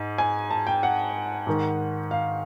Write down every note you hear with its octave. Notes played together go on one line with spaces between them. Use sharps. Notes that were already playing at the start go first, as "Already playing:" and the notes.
Already playing: G#2
G#5
A5
G5
F#5
G#2 D#3
F5